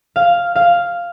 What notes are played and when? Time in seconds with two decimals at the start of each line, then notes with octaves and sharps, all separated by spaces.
0.16 F5
0.56 F5